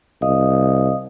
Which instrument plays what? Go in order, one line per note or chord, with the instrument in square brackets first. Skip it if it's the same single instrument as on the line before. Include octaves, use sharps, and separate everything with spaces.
[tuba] C2 [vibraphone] D#5 F5 D#6